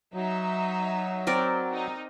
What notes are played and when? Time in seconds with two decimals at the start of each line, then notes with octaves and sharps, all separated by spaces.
0.14 F#3 D#4 E5
1.27 C4 A#4 D5
1.73 D#4